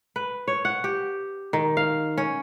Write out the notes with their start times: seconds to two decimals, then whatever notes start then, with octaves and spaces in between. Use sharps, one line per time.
0.16 B4
0.48 C#5
0.65 F#5
0.84 G4
1.53 D#3
1.77 F5
2.18 C#4